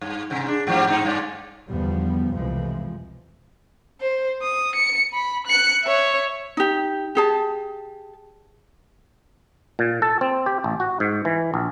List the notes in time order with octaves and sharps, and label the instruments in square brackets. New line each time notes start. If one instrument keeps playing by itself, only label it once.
[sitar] G2
G#2 C3
D4
G#2 F3 G3
G#2 C4 D#4
G2 G#3 D5
[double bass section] E2 D3 F3 G3 B3
C2 F2 B2 E3 F3 G#3
[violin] C5
D#6
C#7
B5
F#6 C#7
C#5 E5
[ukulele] D#4 G4
G4 G#4 A5
[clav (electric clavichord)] A#2
A4
C4
G4
A1
F#4
G#2
E3
A#1